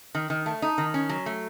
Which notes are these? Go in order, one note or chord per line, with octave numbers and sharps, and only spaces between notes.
D#3
D#3
A3
D#4
D#3
C#4
F#3
A3